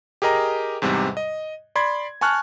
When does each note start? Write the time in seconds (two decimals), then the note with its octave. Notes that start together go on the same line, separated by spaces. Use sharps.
0.22 G4 G#4 A#4 D#5 A#5
0.82 E2 G#2 C3 G3
1.17 D#5
1.75 D5 B5 C6 G#6
2.21 G#5 A5 C#6 F6 F#6